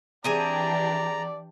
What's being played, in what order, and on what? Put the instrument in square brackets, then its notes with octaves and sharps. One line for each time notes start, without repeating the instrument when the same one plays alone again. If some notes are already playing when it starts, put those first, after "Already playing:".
[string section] E3 D4 G4 [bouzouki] C4 G#4 G#5 [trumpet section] D5 [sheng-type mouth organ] A#5